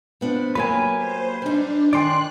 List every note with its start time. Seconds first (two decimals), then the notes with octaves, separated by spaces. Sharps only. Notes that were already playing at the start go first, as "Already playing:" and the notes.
0.21 F3 B3 D4
0.55 F#3 A#3 G4 B4 G#5
0.95 C5
1.42 G3 D4 D#4
1.93 D#3 D5 G5 G#5 C6 F#6